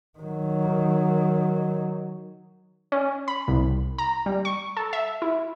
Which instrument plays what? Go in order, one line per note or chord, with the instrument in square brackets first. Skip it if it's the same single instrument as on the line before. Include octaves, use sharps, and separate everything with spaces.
[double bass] D#3 F#3
[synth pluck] C#4
B5
C2
A#5
G3
C#6
A4
E5
E4